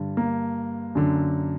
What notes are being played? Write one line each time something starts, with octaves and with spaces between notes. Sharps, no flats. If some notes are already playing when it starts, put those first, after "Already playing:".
Already playing: G2 D3
A#3
F#2 D3